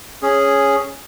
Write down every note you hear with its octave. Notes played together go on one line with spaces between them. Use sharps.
C#4 G#4